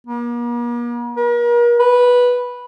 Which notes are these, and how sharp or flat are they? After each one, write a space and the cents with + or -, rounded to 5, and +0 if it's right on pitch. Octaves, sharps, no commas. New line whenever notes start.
A#3 +45
A#4 +40
B4 -10